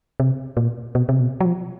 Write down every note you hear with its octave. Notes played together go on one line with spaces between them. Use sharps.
C3
A#2
B2
C3
B2
F#3
F3